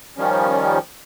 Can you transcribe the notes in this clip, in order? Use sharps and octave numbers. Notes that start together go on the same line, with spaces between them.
D#3 F3 G3 C#4